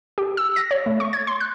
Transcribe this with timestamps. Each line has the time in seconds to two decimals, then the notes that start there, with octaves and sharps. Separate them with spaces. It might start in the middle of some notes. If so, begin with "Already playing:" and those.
0.18 G4
0.37 E6
0.56 A#6
0.71 C#5
0.86 A3
1.00 C#6
1.13 G#6
1.27 C6
1.40 F#6